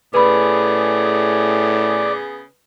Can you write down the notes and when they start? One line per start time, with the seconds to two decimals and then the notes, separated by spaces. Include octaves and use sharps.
0.14 A2 C#3 B3 G#4 B4 D5 B5